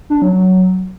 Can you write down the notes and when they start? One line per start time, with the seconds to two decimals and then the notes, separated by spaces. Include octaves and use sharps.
0.10 D4
0.22 F#3
0.34 F#3